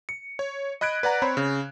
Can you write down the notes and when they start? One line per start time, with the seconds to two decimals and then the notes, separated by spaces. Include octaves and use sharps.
0.09 C#7
0.39 C#5
0.81 D#5 B5 F#6 G#6 D7
1.03 B4 D5 F#5 A#5
1.22 C4 C5 C#5 B5
1.37 C#3